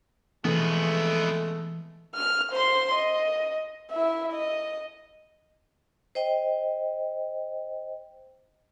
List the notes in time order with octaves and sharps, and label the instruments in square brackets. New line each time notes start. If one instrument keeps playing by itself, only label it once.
[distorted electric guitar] F2 B3 [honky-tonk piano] B2 [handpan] E3 [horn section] G#3 A3
[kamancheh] F6
C5 C6
D#5
E4 E5
D#5
[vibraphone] C5 D#5 G5